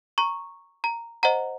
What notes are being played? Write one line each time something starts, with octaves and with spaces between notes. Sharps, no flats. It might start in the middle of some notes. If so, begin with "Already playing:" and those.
A#5 C#6
A#5
C5 D#5 F#5 A#5